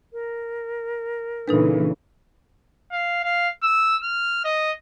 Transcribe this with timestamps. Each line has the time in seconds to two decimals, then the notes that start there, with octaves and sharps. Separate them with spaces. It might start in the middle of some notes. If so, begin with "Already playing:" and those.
0.13 A#4
1.48 A#2 C#3 E3 D4 D#4 A4 B4
2.92 F5
3.24 F5
3.63 E6
4.03 F6
4.45 D#5